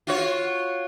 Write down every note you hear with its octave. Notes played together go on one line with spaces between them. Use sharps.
F4 F#4 C#5